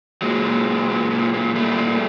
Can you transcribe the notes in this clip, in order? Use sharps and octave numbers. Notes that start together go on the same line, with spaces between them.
A#2 F#3 G#3
A#2
A#2
A#2
A#2
A#2
A#2 G3 A3
A#2